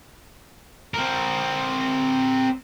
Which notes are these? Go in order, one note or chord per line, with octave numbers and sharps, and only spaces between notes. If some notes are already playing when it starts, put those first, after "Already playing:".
C4 A#4